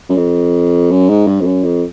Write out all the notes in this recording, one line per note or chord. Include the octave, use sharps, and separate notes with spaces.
F#2
F2
F#2
G#2
G2
F2
F#2
F2